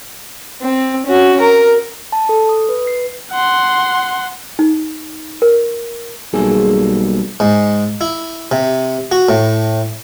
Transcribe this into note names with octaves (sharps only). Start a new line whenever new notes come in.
C4
C#4 F#4
A#4
A5
A4
D#6
B4
C7
F#5 C6
D#4
A#4
B1 G3 A#3 G#4 A4
G#2
E4
C3
F#4
A2